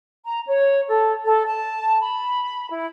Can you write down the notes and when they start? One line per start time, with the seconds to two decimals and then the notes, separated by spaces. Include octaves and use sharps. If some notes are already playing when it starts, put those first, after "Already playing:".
0.24 A#5
0.48 C#5
0.89 A4
1.24 A4
1.46 A5
2.00 B5
2.70 E4